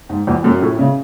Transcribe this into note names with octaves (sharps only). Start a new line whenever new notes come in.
G#2
E2
F#2
A2
C#3